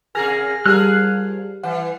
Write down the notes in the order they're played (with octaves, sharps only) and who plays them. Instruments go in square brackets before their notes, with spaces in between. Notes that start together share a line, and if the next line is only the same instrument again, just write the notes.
[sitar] C3 G#4 A#4 [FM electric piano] G#5 F6 A#6
[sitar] F3 G#4 A#4 [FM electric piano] G3 [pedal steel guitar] F6 F#6
[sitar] E3 [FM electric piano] F#5